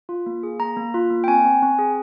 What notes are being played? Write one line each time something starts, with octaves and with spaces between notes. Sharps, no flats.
F4
A#3
G#4
A#3 A#5
A#3
F4
A#3
G5
C4 G#5
C4
C4
G#4